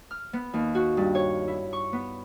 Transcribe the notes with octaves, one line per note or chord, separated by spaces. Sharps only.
F6
B3
D#2
F#4
G2
C#5
E4
C#6
B3